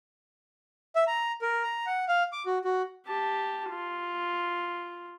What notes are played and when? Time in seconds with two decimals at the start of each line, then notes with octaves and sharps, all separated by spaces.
0.96 E5
1.07 A#5
1.42 A#4
1.63 A#5
1.86 F#5
2.08 F5
2.33 D6
2.46 F#4
2.64 F#4
3.06 G4 A5
3.70 F4